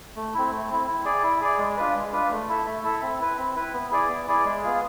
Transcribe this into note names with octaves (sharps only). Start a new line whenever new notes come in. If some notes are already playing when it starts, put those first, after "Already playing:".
A3
C4 E4
A3
C4 E4
E4
G#4 D5
E4
G#4 D5
G#3
D4 F4 B4
G#3
D4 F4 B4
A3
E4 A4 E5
A3
E4 A4 E5
C4
E4 B4
C4
E4 B4
B3
E4 G#4 D5
B3
E4 G#4 D5
G#3
B3 F4 G#4